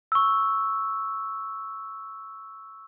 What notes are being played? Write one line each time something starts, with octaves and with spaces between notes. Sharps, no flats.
C#6 E6